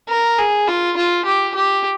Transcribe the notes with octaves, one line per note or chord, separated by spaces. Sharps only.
A#4
G#4
F4
F4
G4
G4